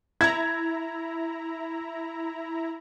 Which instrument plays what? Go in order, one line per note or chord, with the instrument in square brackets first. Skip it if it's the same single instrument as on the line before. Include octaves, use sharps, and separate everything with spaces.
[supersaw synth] E4 A#5 [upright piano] G#6